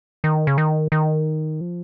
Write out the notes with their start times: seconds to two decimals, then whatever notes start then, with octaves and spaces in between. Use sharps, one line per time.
0.24 D#3
0.47 C#3
0.58 D#3
0.92 D#3
1.61 F3